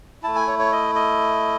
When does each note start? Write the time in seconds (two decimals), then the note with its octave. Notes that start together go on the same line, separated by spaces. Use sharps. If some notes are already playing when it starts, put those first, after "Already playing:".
0.23 A3 E4 A5
0.36 G#5
0.48 C#5
0.59 C#5
0.72 D#5
0.95 D#5